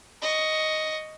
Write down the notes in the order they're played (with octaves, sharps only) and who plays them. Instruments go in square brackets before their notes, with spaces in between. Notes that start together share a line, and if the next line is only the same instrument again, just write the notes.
[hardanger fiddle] D#5 C#6